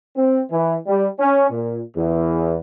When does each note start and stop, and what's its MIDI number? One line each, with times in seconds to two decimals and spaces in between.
0.17 0.41 60
0.51 0.76 52
0.87 1.07 55
1.20 1.49 61
1.50 1.80 46
1.96 2.57 40